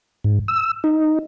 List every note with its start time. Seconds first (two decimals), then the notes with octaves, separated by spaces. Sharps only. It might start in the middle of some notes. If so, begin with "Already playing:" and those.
0.24 G#2
0.48 E6
0.84 D#4